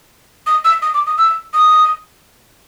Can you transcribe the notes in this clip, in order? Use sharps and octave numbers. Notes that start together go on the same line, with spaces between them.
D#6
E6
D#6
D6
D#6
E6
D#6